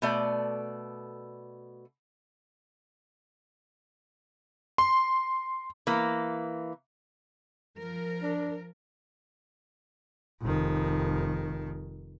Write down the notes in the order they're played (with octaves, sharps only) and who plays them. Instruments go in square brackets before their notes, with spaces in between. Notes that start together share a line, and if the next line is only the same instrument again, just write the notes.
[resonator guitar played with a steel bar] B2 A3 D5
[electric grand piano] C6
[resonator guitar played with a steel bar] E3 A#3
[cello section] F3 A#4
[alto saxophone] D4
[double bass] F1 D#3